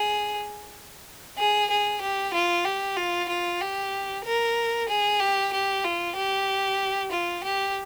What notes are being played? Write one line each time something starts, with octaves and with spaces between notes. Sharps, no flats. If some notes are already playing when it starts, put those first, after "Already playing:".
Already playing: G#4
G#4
G#4
G4
F4
G4
F4
F4
G4
A#4
G#4
G4
G4
F4
G4
F4
G4